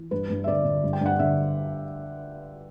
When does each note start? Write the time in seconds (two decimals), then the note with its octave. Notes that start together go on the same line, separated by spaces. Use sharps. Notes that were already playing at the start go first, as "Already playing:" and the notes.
Already playing: E3
0.11 G2 B4
0.30 G2
0.44 E5
0.48 D3 D5
0.65 D3
0.84 G2
0.93 G5
1.01 G2 F#5
1.19 D3 E5